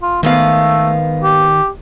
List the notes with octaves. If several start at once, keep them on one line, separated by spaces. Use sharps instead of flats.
F4
G#2 D#3 A3 B3 F5
G4